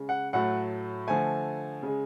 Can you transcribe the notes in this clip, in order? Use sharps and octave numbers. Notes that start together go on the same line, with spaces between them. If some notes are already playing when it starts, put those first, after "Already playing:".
Already playing: C#3 G#3
F#5
A2 F#3 A3 F#5
D3 F3 A3 G#5
C#3 G#3